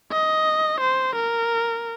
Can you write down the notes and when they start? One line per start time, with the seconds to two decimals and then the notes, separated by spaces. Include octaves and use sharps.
0.12 D#5
0.81 C5
1.16 A#4